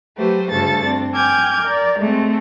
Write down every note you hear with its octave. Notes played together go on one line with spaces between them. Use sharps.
F#3 A3 G4 B4 C5
D2 G2 C#3 A4 A6
C4 D4
G5 G#5 D6 F6 G6 G#6
A#4 D5
G#3 A3 C4